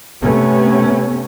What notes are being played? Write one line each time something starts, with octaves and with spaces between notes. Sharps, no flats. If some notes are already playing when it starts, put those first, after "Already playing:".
C3 A3 B3 C#4